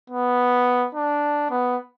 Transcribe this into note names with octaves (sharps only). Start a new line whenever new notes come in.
B3
D4
B3